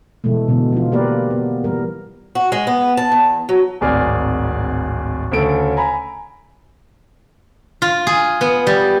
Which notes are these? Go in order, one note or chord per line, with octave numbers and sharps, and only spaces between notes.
B2 E3 G#3 A3
B2 D3 E3 B3
F3 A3 D#4 F4
A#3 G4 A#4 B4 D5 F5
B3
E3 G3 A#4
F#4
G#3
B3
A5
E2
F#3
D1 G#1 G#4 D5 F6
D2 C#3 C#4 A4 D7
G#5 A#5 B5
F4
G#4
B3
G3